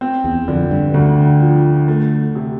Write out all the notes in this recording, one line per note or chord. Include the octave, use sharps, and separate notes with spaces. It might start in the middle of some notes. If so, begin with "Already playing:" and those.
C4
E2
F2 D3
G2
D2 D3
F3
A3
C3